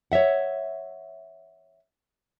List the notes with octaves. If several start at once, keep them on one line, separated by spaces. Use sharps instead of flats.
C#5 D5 E5 F#5